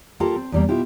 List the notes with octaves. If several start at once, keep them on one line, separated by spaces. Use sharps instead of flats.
A#3 F4 G4 A4 A#4
C4
E2 G3 A#3
B2 E4 F4 G4